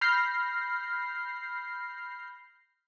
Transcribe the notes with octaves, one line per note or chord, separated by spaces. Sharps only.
B5 F6 G6 A#6 C7